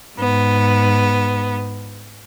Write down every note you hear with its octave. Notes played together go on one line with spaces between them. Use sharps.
G#2 B3